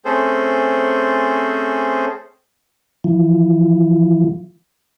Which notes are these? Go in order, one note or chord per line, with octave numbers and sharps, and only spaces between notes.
A3 C4 C#4 G#4 A4 C5
E3 F3